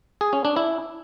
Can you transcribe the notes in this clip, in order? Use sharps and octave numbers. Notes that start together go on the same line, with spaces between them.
G#4
C#4
D4
E4